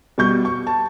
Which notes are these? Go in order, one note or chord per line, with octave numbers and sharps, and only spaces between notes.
B2 G3 C#6 G6
C#6
A5